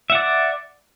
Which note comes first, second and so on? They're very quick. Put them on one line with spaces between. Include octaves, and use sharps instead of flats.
E5 F#5 D5